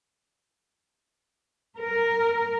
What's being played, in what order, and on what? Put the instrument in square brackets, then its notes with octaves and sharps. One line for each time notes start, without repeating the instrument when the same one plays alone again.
[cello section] A#4